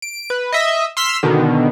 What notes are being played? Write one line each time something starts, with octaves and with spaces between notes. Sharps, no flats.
D7
B4
D#5 E5
C6 E6 F6 B6
B2 D3 D#3